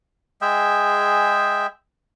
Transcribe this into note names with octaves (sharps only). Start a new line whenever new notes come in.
G#3 G#4 E5 G5